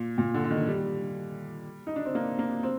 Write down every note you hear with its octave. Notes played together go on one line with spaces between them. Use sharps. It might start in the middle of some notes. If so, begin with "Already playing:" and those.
Already playing: A#2
A#2
D3
D3
D#3
G3
D#4
D4
C4
A#3
A#3
C4